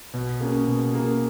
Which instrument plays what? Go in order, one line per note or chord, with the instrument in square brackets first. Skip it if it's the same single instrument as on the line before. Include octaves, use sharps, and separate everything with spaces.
[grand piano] B2
A#3 C#4 G#4
B2
A#3 C#4 G#4